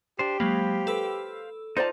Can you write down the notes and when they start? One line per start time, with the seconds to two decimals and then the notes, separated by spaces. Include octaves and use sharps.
0.19 D4 G4 C5
0.40 F#3 G#3 A#3 C5 F5 B5
0.87 A4 B4 E6
1.77 D#4 F4 C5 D5 A5